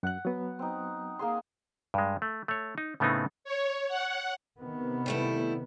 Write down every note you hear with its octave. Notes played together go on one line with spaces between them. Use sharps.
F#2 F#5 F#6
F#3 B3
C4 D#4
A#3 G#4 C6
G2 G#3
A3
A3 C#5
D#4
A2 C#3 A3 B3 C4 D#4
C#5
F#5
C3 D#3 B3
G3 A3 E4